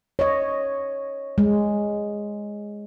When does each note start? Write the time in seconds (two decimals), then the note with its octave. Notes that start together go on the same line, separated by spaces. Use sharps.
0.19 C#5 D#5
1.38 G#3